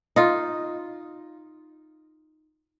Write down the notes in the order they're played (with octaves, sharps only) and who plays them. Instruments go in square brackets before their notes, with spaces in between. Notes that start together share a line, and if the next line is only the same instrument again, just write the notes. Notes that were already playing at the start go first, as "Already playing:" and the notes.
[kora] D#4 F4